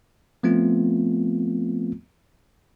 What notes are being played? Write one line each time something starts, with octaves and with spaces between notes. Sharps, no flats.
F3 A3 B3 C4 F4